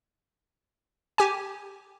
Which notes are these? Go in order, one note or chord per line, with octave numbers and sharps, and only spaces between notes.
G4 G#5